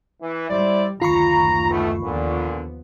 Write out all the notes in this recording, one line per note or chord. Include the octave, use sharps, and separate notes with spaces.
E3
G3 E4 C5 D5
F#1 D2 D#3 F4 A#5 B5 C#6
B1 A3
D#2 A#2 D3 F3 B3